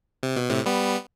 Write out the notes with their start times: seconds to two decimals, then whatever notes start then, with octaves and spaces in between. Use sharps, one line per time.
0.23 C3
0.36 B2
0.49 A2 C3
0.66 G3 B3